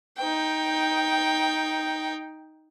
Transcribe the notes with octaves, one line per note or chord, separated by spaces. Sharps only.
D#4 G5